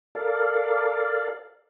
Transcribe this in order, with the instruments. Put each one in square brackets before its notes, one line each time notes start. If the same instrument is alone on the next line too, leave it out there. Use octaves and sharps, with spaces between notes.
[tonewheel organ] A4 A#4 D5 F5